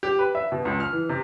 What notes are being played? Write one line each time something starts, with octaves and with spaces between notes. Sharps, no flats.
G4
B4
E5
B2
C#2
F6
E3
C3